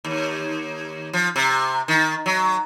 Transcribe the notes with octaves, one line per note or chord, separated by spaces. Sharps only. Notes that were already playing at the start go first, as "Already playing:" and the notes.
D#2
F3
C3
D#3
F#3